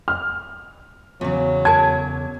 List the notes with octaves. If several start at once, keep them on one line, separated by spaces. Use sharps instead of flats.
F6
E2 C#3 F#3
A#4 G#5 A5 G#6